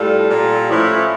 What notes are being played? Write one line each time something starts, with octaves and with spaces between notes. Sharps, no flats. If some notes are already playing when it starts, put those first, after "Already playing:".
Already playing: A2 G3 F4 A4
A#2 G3
A2 F3 C#4 E4